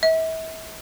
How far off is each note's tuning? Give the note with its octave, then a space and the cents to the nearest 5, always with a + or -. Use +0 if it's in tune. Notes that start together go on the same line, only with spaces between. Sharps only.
E5 -40